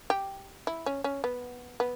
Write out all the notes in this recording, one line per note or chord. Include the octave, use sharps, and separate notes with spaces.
G4
E4
C#4
C#4
B3
B3